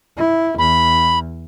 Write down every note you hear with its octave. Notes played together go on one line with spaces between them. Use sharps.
E4
E2 B5